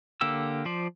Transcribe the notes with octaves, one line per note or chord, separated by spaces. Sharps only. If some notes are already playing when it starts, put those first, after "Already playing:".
D3 A#3 G4 E6
F3 C5 D5